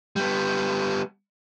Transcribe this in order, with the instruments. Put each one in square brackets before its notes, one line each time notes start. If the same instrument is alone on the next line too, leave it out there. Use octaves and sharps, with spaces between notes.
[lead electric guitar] G3 B3